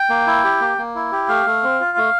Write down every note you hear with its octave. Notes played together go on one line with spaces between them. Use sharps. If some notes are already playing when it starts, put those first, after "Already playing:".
Already playing: G5
A#3
E4
G4
A#3
A#3
E4
G4
A3 F5
A3
C4
F4
A3